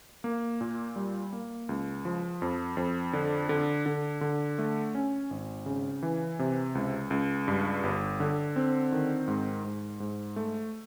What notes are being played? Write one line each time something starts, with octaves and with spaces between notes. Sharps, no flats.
A#3
A#2
G3
A#3
C#2
F3
F2
F2
D3
D3
D3
D3
A3
C#4
G#1
C#3
E3
C3
C#2
C#2
G2
G1
D3
C4
D#3
G#2
G#2
G#2
A3